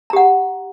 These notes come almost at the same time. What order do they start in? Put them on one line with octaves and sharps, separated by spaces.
A#5 G4 F#5